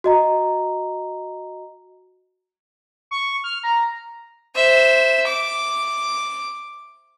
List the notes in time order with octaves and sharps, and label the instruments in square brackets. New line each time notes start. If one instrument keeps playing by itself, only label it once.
[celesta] F#4 D#5 A#5
[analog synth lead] C#6
F6
A#5
[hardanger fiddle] C5 E5
D6